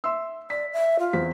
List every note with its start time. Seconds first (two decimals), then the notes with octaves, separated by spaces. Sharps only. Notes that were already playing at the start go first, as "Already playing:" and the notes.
0.04 E5 C6 E6
0.50 D5 B6
0.73 E5
0.99 F4
1.13 E2 C4 B6